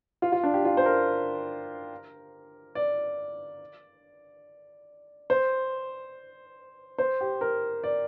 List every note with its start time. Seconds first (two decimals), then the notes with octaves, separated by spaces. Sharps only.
0.22 F4
0.32 F4
0.43 D4
0.54 G4
0.65 F4
0.77 C5
0.85 A#4
2.75 D5
5.30 C5
6.98 C5
7.21 G4
7.41 A#4
7.84 D5